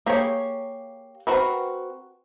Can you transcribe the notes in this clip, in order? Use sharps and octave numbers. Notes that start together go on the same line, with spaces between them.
A#3 G4 G#4 C#5
C4 F#4 A#4 B4